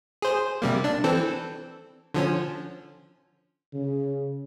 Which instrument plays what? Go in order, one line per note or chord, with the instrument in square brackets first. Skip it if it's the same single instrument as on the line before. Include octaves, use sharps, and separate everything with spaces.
[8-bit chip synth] G#4 C5
C3 G3 A#3
D4
E3 C4 A4
D3 F3 C#4
[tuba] C#3